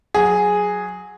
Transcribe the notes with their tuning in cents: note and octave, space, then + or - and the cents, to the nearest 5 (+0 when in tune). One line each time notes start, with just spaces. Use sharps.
F#3 -10 G#4 +0